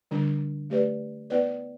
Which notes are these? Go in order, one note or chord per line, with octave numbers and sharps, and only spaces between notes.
D3 G3 D4
A3 G4 B4 D5
B3 E4 B4 D5